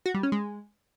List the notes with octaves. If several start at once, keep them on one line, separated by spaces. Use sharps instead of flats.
F#4
G3
C#4
G#3